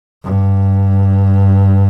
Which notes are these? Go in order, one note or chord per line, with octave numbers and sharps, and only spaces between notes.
G2